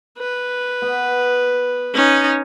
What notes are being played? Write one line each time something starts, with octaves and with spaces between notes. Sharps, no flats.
B4
B3
C#4 D#4